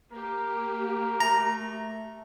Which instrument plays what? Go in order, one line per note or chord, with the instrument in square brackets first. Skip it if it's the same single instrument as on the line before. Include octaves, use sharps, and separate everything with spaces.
[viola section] A#3 G4 [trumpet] A#4
[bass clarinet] A3 [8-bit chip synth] A#5